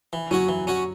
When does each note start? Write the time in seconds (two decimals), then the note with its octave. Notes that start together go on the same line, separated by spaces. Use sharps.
0.13 E3
0.31 F#3 C#4 F#4 C#5
0.49 E3
0.67 C#4 F#4 C#5